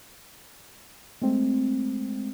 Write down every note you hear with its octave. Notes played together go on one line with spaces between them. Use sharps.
G#3 A3 C4